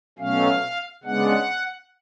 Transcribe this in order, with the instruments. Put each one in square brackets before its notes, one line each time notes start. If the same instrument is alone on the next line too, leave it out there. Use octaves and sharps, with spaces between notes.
[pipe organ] B2 F#3 A3 C#4 F5
C#3 G#3 B3 D4 F#5